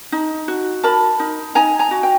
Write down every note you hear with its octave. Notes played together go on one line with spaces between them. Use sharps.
D#4
F#4
A#4 A5 B5
D#4
D#4 G#5 A#5
G#5 A#5
F#4
G5